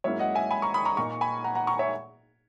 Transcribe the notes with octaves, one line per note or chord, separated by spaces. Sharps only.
G#2 F#3 A#3 C#4 E4 C#5 E5
D#5 F#5
E5 G#5
G#5 B5
A#5 C#6
B5 D#6
A#5 C#6
A#2 A#3 D#4 A#5 C#6
G#5 B5
F#5 A#5
F#5 A#5
A#5 C#6
C#5 E5